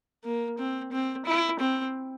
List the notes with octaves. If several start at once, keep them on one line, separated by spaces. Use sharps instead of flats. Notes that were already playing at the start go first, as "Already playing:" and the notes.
A#3
C4
C4
E4
C4